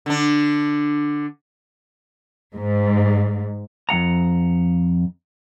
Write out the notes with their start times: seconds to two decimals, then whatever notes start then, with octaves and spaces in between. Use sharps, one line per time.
0.06 D3 D4
2.55 G#2
3.89 F2 B3 F#5 A#5